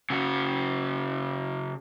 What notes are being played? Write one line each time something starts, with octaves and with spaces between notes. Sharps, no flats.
C#3 F#4